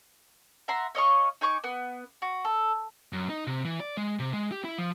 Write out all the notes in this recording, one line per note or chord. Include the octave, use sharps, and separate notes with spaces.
E5 F#5 A#5 C6
C#5 D#5 F5 C#6
D#4 G#5 C#6 D6
B3
F#4
A4
F#2
D#4
C3
E3
D5
G#3
C3
G#3
G4
E4
F3